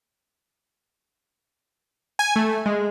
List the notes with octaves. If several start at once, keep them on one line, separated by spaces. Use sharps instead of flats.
G#5
A3
G#3